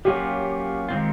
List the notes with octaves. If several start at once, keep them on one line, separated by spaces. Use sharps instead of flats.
F#3 A#3 C#4 F4 G4
D#3 G#3 C4 F4